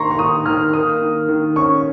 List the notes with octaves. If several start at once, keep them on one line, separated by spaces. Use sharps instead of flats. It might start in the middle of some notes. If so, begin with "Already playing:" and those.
Already playing: D#3 A#3 D#4 A#5 C6 C#6
C#6
D#3 D#6
D#3 F6
A#3 D#6
D#3
D#3
C#4 C#6